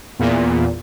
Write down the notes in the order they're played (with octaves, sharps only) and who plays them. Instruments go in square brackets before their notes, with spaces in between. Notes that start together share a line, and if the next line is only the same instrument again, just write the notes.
[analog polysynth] E2 A#2